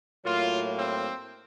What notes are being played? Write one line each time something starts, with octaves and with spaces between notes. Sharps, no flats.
A2 F#3 A#3 F4
C4